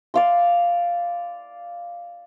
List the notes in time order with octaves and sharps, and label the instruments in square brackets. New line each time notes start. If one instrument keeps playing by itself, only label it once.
[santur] D5 F5 C6